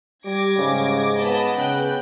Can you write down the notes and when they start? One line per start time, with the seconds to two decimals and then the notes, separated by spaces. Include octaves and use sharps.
0.25 G3 D6 G#6 A#6
0.58 G#2 C#3
1.21 B3 D#5 A5 B5
1.57 C#3 G5 F#6 G6